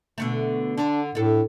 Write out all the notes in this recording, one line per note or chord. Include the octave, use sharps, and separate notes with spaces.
B2 D3 A3
D3 D4
A2 D4 A4